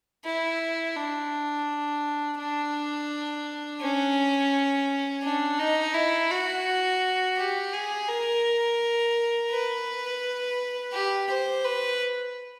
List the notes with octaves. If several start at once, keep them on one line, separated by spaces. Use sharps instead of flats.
E4
D4
D4
C#4
D4
D#4
E4
F#4
G4
G#4
A#4
B4
G4
C5
B4